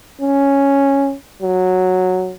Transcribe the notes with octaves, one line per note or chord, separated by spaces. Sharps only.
C#4
F#3